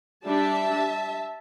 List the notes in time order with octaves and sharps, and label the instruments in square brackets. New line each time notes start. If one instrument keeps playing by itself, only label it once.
[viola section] G3 D4 E5 A5